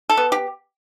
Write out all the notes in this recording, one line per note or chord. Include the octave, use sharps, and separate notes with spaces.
A4
B3
G4